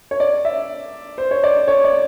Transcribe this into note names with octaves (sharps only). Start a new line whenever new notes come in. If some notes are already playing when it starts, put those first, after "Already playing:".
C#5
D5
E5
C5
C#5
D5
C#5
D5